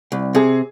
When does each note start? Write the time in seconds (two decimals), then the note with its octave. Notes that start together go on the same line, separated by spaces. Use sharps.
0.12 C2
0.35 C3 G#4